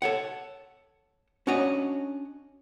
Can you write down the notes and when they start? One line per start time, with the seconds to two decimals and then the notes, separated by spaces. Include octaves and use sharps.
0.02 A4 C#5 F#5
1.47 C#4 D4 F#4 C#5 D#5